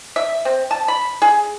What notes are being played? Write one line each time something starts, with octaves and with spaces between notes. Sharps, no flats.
E5
C4
A5
B5
G#4